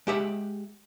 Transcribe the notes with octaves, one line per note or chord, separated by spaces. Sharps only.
G#3 G4 E5 F#5